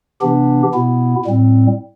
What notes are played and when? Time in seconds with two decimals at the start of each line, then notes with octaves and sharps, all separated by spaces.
0.21 C3 E3 B3 D4 G4
0.73 B2 B3 E4
1.25 A2 G3 C4